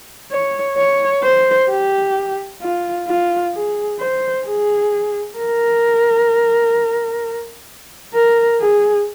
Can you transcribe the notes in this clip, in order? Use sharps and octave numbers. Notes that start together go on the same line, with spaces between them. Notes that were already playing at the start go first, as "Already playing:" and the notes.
C#5
C#5
C5
G4
F4
F4
G#4
C5
G#4
A#4
A#4
G#4